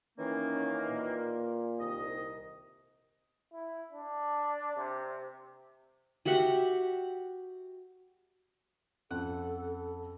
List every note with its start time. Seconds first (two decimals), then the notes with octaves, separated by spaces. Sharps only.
0.19 D#3 E3 A#3 C#4
0.90 A#2
1.80 C2 D#3 D#5
3.53 E4
3.92 D4
4.77 C3
6.25 F#4 G4 E5 F#5
9.11 F2 C#4 A4 F#5 F#6